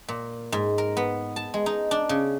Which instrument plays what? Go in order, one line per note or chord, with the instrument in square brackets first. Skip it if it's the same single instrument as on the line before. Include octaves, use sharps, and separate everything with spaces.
[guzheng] A#2
G#2
A#4
B3
A5
G#3
D#4
D4
C#3